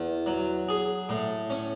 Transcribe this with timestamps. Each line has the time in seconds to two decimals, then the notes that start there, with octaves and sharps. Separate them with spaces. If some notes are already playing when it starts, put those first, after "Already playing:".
Already playing: E2
0.26 F#3
0.69 G#4
1.09 A2
1.50 C#4